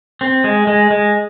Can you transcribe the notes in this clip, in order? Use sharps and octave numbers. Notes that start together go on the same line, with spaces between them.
C4
G#3
G#3
G#3